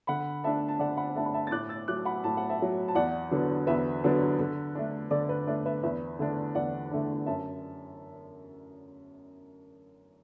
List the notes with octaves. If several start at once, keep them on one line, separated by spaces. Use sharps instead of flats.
D3 F#5 B5
A3 D4 E5 A5
A5
D3 D5 F#5
F#5 B5
A3 D4 E5 A5
B5
E5 A5
A6
A2 D6 F#6
E6 A6
F#3 A3 D6 F#6
F#5 B5
A2 A5
F#5
E5 A5
F#3 A3
A5
E2 D5 F#5
D3 F#3 B3 D4
E2 B4 E5
D3 F#3 B3 D4
D3
A3 D4
D3 D5
B4
A3 D4 D5
B4 E5
E2 B4 E5
D3 A3 D4
E2 D5 F#5
D3 A3 D4
F#2 E5 A5